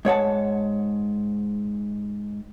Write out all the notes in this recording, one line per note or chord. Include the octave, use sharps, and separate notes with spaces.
G#2 C#5 F#5 A5